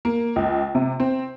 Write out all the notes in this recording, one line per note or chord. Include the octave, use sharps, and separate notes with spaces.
A#3
C#2
C3
C4